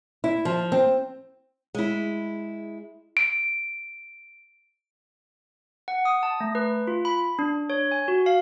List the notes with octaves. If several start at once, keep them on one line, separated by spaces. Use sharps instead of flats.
E4
F3
C4
G#3 E4
D7
F#5
D#6
A5
A3
B4
F4
B5
D4
C#5
G#5
F#4
F5